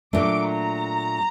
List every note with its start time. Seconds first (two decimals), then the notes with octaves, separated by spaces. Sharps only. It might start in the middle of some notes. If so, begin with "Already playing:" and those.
0.13 A#2 F#3 A3 D4 D6
0.46 A#5